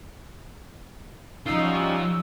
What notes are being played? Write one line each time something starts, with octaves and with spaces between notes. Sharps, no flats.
F3 G3 C#4 D#4 F4 F#4 E6